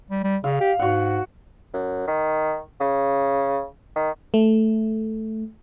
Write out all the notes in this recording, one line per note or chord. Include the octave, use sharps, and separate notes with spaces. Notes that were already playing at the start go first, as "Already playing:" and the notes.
G3
G3
C#3 F5
G4
G#2 F#4 F#5
F#2
D#3
C#3
D#3
A3